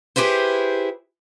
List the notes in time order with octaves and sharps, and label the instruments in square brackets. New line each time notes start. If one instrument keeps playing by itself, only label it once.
[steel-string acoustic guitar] E4 G4 G#4 B4 C5